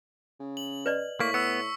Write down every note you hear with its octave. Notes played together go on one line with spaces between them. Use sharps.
C#3
F#7
B4 D5 D#5
A2 A#3 C#6 B6
B3 E6 C#7